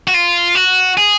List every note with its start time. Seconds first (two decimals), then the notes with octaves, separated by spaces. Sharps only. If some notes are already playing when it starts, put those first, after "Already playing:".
0.08 F#4
0.14 F4
0.55 F#4
0.97 G#4